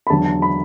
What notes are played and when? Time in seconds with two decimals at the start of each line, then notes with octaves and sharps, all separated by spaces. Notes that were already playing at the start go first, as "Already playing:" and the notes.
0.07 B5
0.10 E2 D3 F#3 A5
0.25 A5
0.42 B5